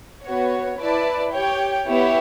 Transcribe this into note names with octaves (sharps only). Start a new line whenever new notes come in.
B3 F#4 C#5
E4 B4 D5 A5
G4 C#5 G5
B3 E4 G4 C#5 E5